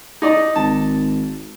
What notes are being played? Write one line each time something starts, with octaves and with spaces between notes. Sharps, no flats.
D#4 D5 D#5
G#1 A5